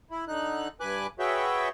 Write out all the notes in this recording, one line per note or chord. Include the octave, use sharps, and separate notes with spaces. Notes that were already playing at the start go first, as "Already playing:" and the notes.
E4
D3 D#4 F#6
G2 B4 G#5 D6 F#6
F#4 G#4 B4 C#5 E5 G5